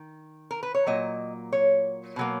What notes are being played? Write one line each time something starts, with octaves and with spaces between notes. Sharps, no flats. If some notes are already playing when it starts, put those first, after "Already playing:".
Already playing: D#3
A#4
B4
C#5
A#2 F#3 A#3 D#5
C#5
B2 F#3 A#3